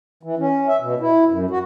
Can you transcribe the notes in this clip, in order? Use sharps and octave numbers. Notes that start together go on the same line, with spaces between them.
E3
C#4
E5
B2
E4
F#2
F#4